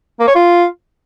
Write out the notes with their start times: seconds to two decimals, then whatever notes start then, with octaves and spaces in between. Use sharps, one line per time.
0.20 A#3
0.28 C#5
0.36 F4